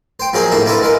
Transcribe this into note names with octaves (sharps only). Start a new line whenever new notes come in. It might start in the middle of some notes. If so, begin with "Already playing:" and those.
C5 G5
F3 F#3 A#3 G#4 C5 D#5
A2 A#3 D4 E5
A#3 D4 E4 F4 A4 B4
G#3 F4 A#4